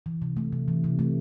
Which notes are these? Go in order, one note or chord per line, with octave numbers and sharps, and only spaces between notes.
E3
C3
A3
C3
E3
C3
A3